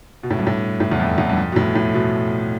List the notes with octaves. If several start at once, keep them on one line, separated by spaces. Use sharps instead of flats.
B2
A2
G2
A2
A2
E2
F2
E2
G2
F2
B2
A2
A2
B2